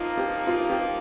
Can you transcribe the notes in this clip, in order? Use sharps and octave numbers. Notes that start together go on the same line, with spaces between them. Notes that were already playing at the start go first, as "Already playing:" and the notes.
Already playing: F3 A#3 D#4 F4
G4
F4
G4